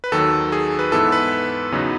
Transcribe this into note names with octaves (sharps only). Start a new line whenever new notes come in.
B4
D#2 D#3 F#3 A4
G#4
B4
G#2 E3 B3 E4 A4
B4
E2 C#3 F#3 B3 D#4